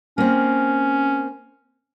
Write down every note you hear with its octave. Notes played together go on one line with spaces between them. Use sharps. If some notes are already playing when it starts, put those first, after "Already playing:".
A#3 C4 C#4